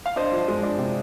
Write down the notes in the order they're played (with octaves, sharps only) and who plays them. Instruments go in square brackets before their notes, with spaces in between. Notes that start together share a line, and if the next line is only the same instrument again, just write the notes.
[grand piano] F5
[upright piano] D4 [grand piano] C5 D#5
[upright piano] F3
G#3
D4
C3